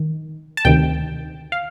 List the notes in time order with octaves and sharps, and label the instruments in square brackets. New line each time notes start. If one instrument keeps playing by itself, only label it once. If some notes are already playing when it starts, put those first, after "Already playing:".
Already playing: [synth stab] D#3
A5
D2 C3 D#3 G5
F5